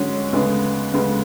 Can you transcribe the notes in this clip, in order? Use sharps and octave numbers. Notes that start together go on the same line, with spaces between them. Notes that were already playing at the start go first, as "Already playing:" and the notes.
Already playing: D3 G#3 C#4 F#4
D2 C#3 G#3 B3
D2 C#3 G#3 B3